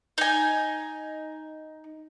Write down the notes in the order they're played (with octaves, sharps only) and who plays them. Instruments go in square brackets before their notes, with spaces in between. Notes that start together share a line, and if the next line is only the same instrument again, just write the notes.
[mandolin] D#4 G#5